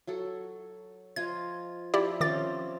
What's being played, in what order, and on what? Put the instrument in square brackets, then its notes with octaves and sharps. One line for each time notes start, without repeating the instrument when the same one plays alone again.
[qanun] F#3 F#4 A4
[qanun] F3 F4 D#5 [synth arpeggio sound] G#6
[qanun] F3 E5 [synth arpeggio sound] E4 G4 D5
[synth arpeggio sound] D#3 D6 A6 [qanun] F3 C4 C#4